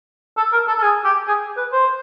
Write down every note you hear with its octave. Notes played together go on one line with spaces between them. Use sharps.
A4
A#4
A4
A4
G#4
G4
G#4
B4
C5